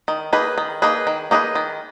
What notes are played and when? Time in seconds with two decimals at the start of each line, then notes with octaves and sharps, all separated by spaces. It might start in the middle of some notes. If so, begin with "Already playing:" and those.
0.08 D#3
0.33 A#3 D#4 G#4 B4
0.58 D#3
0.82 A#3 D#4 G#4 B4
1.07 D#3
1.31 A#3 D#4 G#4 B4
1.55 D#3